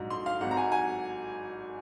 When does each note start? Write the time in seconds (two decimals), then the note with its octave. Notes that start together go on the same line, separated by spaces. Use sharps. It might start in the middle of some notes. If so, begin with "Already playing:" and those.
Already playing: A#1 G#2 F#3
0.10 C6
0.26 F5
0.41 G#1 G#2 F#3 F#5
0.51 A#5
0.57 G#5
0.72 G#5